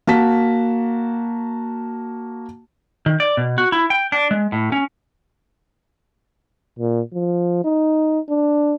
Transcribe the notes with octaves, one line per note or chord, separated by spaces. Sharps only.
A#3 F#4 A5 B6
D#3
D5
B2
F#4
E4
G5
D4
G#3
A2
C#4
A#2
F3
D#4
D4